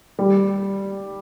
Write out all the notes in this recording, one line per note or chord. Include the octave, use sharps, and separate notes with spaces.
G3